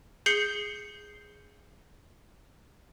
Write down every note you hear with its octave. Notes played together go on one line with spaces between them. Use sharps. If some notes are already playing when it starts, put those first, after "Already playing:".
G#4 G6 C7 C#7 G7